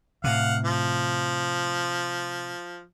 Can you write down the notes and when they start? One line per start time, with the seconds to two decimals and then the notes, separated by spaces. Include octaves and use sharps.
0.24 A2 C3 F5 F#5
0.65 F3